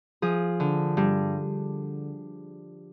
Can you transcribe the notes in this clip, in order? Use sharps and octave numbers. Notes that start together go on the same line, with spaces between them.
F3 G#4
D3
G2